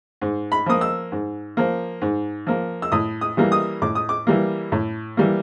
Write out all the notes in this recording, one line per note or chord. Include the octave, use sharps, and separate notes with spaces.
G#2
B5
F3 A#3 D#6
E6
G#2
F3 A#3
G#2
F3 A#3
E6
A2 D#6
D#6
E3 G3 A#3
D#6
A2 D6
D#6
D6
E3 G3 A#3
A2
E3 G3 A#3